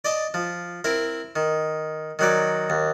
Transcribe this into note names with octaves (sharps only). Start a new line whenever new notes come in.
D5 D#5 A5
F3
C4 E4 A#4
D#3
D#3 F#3 D5
D#2